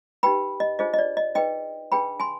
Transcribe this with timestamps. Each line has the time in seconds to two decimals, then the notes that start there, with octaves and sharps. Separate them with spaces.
0.23 D#4 G4 B4 G5 B5
0.60 D#5
0.79 D4 F4 G#4 C5 D#5
0.94 D#5
0.98 D5
1.17 D#5
1.35 D#4 G#4 B4 D#5 G5
1.92 D4 G#4 B4 G5 B5
2.20 G#5 C6